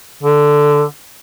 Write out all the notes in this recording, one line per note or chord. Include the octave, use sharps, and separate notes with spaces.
D3